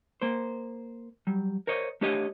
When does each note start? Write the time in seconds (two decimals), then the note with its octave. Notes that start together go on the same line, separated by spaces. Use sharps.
0.22 A#3 C5
1.27 F#3 G3
1.67 A#4 C5 C#5 D#5
2.01 A3 D4 G4 C#5 D#5